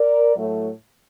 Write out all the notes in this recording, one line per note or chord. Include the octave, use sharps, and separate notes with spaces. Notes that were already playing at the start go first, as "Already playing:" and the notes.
Already playing: A#4 D5
A2 F#3 A3